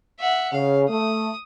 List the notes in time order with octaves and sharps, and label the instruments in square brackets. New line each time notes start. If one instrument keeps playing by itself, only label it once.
[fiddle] E5 F#5
[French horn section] C#3 [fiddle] F5
[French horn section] A3 [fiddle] D#6